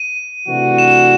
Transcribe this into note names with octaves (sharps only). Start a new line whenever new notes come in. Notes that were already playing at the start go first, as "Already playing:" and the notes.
Already playing: D#7
C3 E3 A3 D4 F#4
E7